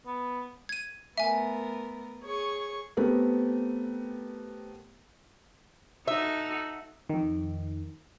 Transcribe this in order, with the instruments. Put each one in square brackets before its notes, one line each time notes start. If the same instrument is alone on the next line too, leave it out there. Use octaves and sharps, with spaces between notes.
[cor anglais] B3
[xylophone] G#6 D#7
[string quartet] A3 B3 A#4 [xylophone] E5 G#5
[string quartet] G#4 C#5 C#6
[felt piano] A3 B3 C4 G4 A#4
[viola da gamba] D#4 F#4 A4 [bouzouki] E5
[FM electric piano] F2 D#3